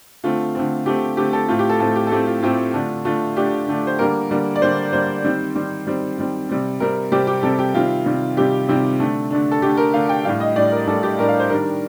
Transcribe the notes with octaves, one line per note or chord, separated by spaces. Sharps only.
D3 A3 C4 F4
D3 A3 C4
D3 A3 C4 G4
D3 A3 C4 G4
A4
A2 A3 C4 F4
G4
A4
A2 A3 C4 A4
G4
A4
A2 A3 C4 G4
F4
A2 A3 C4 F4
D3 A3 D4
D3 A3 D4 F4
D3 A3 D4 G4
D3 A3 D4
C5
D3 G3 A#3 A#4
D3 G3 A#3
D5
D3 G3 A#3 C5
D3 G3 A#3 C5
D#3 G3 C4
D#3 G3 C4
D#3 G3 C4
D#3 G3 C4
C3 G3 C4
C3 G3 C4 A#4
C3 G3 C4 G4
G4
C3 G3 C4 A4
G4
C3 D#3 G3 C4 F4
C3 D#3 G3 C4
C3 D#3 G3 C4 G4
C3 D#3 G3 C4
D3 A3 D4
D3 A3 D4
A4
D3 A3 D4 G4
A#4
D3 A3 D4 F5
G5
A2 G3 D4 F5
D#5
A2 G3 D4 D5
A#4
A2 G3 D4 A4
G4
A2 G3 D4 A#4
F5
C5
D#3 G3 D4 A#4